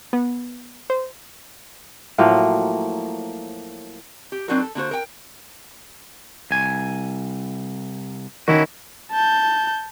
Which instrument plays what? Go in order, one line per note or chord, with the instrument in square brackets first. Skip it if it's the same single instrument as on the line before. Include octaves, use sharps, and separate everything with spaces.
[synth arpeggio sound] B3
C5
[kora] A2 F3 F#3 A#3
[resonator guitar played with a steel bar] G4
F#3 C4 D4 D#4 F#4 A#4
A4
D3 A#3 F#4 C5
A#4 G5
[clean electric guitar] C2 G#5
[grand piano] D#3 [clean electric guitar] C#4 E4 F#4
[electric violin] A5 G6